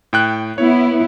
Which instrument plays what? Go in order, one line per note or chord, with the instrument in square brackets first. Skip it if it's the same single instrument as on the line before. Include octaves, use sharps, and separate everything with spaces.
[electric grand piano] A2 G5 F#6
[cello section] B3 E4 [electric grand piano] C#5